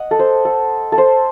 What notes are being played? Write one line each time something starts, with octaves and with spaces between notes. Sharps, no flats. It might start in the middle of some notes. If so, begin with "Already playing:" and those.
Already playing: D#5 F#5
A4
C5
A4
A4
C5